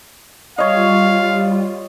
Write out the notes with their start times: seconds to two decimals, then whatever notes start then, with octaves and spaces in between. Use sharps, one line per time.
0.58 G3 F4 C#5 D#5 F5